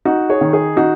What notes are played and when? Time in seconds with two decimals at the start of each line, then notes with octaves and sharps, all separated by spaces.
0.05 D#4 F#4
0.30 G#4 C#5
0.41 D#3
0.53 G#4
0.77 D#4 F#4